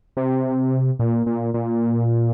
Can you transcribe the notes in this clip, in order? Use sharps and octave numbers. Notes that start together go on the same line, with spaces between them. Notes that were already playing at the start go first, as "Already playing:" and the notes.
C3
A#2
A#2
A#2